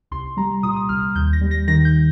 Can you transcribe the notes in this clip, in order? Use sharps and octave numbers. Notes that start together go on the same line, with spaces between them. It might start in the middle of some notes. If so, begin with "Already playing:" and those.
C2 C6
G3 A#5
A#2 D#6
D#6
C2 F6
D#2 G6
A#6
G3
A#6
D#3 A#6
G6